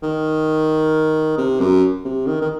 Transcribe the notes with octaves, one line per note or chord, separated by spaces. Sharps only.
D#3
C3
F#2
C3
D#3
D#3